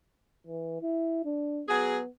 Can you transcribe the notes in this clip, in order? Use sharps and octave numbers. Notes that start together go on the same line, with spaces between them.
E3
E4
D4
F#3 B3 G#4